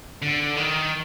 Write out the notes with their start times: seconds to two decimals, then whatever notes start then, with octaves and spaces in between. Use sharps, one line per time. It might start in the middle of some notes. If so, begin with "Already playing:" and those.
0.22 D3
0.57 D#3